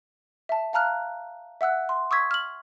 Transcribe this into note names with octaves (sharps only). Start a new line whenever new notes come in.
E5 A5
F5 A5 A#5 F6 F#6
E5 F#5 E6 F#6
C6
C#6 D#6 E6 G#6 B6
F6 F#7